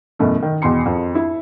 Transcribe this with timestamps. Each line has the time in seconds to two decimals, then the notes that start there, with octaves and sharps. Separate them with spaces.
0.19 F#2 B2 E3 A3
0.42 D#3
0.62 E2 B2 G5 C6 C#7
0.86 F2
1.15 E4